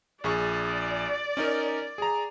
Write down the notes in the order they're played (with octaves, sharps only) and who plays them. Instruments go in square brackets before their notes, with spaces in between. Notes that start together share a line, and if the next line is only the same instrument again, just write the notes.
[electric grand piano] A#1 G#4 C#6 [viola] D5
[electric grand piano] C#4 D#4 A#4
G#4 A#5